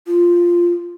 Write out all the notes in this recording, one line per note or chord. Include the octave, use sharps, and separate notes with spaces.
F4